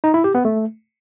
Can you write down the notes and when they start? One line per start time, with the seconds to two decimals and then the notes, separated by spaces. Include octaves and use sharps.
0.04 D#4
0.14 E4
0.24 G4
0.35 B3
0.45 A3